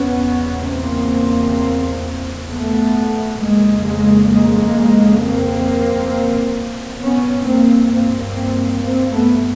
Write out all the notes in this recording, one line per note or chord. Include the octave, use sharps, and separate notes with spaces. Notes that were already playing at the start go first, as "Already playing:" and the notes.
Already playing: E2 C#3 B3 C#4
A#3 C4
A3 B3
F2 C#3 G#3 A#3
G#3 A#3
G#3 A#3
A#3 C4
G2 B3 C#4
A#3 C4
A#3 C4
A#3 C4
A3 B3